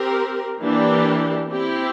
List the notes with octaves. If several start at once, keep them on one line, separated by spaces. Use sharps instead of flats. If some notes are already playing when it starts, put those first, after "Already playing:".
Already playing: C4 G4 A#4
E3 A#3 D4 G4
C4 E4 G4